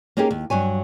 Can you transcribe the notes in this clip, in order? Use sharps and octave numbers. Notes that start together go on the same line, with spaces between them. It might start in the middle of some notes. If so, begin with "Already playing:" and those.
A#3 C#4 D#4 G4 G#4 A#4
D#2
G2 F#3 C#5 G#5